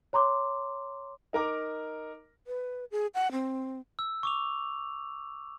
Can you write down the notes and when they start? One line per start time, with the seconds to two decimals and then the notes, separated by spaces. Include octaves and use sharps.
0.13 C#5 A#5 C6 D6
1.33 D#4 A#4 A#5 D6
2.47 B4
2.91 G#4
3.14 F#5
3.32 C4
3.99 E6
4.23 C#6 D6 F7